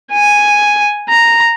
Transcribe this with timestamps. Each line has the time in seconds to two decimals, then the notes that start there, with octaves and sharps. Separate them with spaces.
0.13 G#5
1.09 A#5